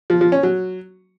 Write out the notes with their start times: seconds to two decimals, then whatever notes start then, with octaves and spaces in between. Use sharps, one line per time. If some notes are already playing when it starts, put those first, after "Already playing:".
0.10 F3
0.21 F3
0.32 C#4
0.43 F#3